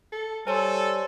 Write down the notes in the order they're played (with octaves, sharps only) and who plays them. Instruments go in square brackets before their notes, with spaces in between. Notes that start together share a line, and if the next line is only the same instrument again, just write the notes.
[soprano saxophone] A4
[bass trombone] G3 [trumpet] A4 [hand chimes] C5 C#5 C6 [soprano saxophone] G#5